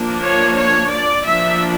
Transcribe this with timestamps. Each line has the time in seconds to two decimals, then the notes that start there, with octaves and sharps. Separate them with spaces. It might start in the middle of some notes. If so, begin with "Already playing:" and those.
Already playing: F3 A#3 D4
0.24 C#5
0.58 C#5
0.92 D5
1.26 F3 A#3 D4 E5